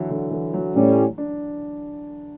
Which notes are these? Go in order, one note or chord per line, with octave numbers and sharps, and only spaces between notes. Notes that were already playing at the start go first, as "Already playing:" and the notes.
Already playing: D3 E3 F#3
D3
E3
F#3
A2 G3 C#4
D4